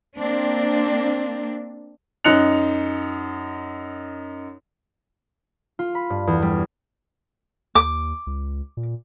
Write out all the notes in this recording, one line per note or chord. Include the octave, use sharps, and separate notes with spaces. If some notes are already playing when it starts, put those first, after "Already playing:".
A#3 C4 D4
F#2 D#4 F#6 C#7 F7
F4
B5
G2
E2
G3
D#2 D6
C#2
A#2